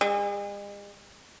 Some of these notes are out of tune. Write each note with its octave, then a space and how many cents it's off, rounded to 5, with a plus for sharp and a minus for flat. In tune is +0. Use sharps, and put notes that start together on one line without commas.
G#3 -45